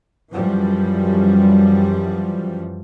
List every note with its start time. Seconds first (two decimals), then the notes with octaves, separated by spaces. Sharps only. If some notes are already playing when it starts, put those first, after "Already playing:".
0.34 F#2 E3 F3 G3